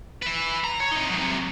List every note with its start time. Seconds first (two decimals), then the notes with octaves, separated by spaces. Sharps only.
0.22 B4 E5
0.64 A#5
0.80 C#5
0.92 C3 D#4
1.10 C3 F#3